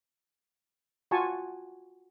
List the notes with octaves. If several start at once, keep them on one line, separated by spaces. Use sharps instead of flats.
F4 F#4 G#5 A5 C#6